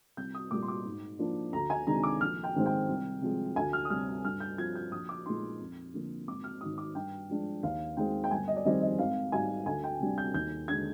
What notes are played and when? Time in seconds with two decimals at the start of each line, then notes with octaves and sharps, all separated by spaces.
0.17 C2 G6
0.35 D#6
0.51 A#2 G3 A#3 D6
0.63 C6
0.68 D6
0.85 G#2
1.19 F3 A#3 D4 F4
1.53 D2 A#5
1.70 G#5
1.87 C3 D#3 G#3 D4 A#5
2.03 D6
2.21 A#1 F6
2.44 G5
2.55 G#2 D#3 G#3 C4
2.66 G5
2.89 C2
3.22 C3 F3 G#3
3.56 D2 G#5
3.73 F6
3.85 D#6
3.90 C3 G3 F6
4.25 G2 F6
4.40 G6
4.58 F3 C4 F4 G#6
4.76 G6
4.92 A#1 D#6
5.09 D6
5.26 A#2 G#3 D#4 C6
5.60 F2
5.94 D3 F3 A#3
6.27 G#1 D6
6.44 F6
6.61 G#2 D#3 D#6
6.78 D6
6.95 G2 G5
7.29 F3 G#3 D4
7.63 D#2 F5
7.97 D#3 G#3 C4 G5
8.24 G5
8.31 G1 G#5
8.48 D#5
8.56 D5
8.65 F2 D#3 G3 C4 D#5
8.82 D#5
8.98 G#1 F5
9.32 G#2 G3 G#5
9.66 D2 G#5
9.84 G5
10.00 C3 G3 D4
10.18 G6
10.34 D#2 G6
10.68 D3 G#3 G#6